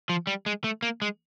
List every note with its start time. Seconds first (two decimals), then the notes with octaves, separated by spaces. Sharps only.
0.09 F3
0.27 G3
0.46 G#3
0.64 A3
0.83 A#3
1.02 G#3